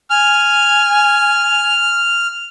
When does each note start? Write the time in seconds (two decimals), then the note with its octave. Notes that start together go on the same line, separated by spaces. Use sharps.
0.10 G#5 F6